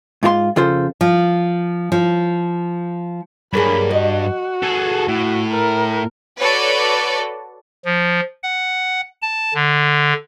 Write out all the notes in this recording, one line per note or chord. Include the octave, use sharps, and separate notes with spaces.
G#2 F4 G4 C6
F2 C#3 F4 A4 C5
F3
F3
G2 F#3 A#3 G#4 B5
F#4 D#5
G#4 A4
A2
A#4
F#4 A4 B4 C#5 D5
F3
F#5
A5
D3